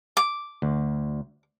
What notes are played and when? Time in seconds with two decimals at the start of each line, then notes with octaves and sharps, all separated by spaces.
0.17 D6
0.62 D2